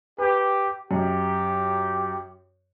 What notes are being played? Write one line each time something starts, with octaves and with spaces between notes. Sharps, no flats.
G4 B4
F#2 G4